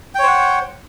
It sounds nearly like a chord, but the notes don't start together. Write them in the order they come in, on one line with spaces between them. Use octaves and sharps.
G5 C#5 C5 F#5